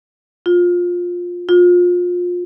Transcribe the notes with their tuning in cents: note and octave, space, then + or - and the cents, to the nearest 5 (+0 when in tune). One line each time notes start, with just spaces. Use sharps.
F4 +15
F4 +25